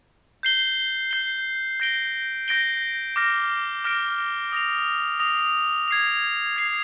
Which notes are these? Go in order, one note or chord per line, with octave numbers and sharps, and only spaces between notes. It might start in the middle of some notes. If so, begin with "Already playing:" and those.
G6 C7 G7
G6 C7 G7
G6 A#6 D7 G7
G6 A#6 D7 G7
D6 F6 A#6 D7
D6 F6 A#6 D7
D#6 A#6 F7
D#6 A#6 F7
G#6 C7 F7
G#6 C7 F7